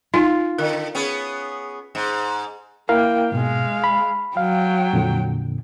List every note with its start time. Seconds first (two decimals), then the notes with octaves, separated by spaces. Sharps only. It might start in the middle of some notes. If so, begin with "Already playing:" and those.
0.14 D#4 F4 F5 G#5
0.58 D3 A#4
0.95 B3 C#4 G#4
1.95 G#2
2.89 A#3 E4 A#4 F5 G5
3.32 G#2 B2 G#3 F5
3.84 B5
4.37 F#3 F5 G5
4.93 F2 A#2 D3